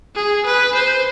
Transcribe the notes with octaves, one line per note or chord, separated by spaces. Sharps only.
G#4
B4
C5